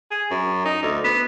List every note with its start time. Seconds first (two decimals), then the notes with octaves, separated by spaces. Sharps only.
0.11 G#4
0.31 F#2
0.65 D#4
0.83 D2
1.04 B3